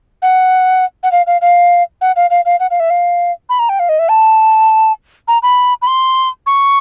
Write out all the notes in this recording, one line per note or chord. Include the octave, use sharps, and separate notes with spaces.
F#5
F#5
F5
F5
F5
F#5
F5
F5
F5
F#5
F5
E5
F5
B5
A#5
G5
F5
D#5
E5
A5
A#5
B5
B5
C6
C#6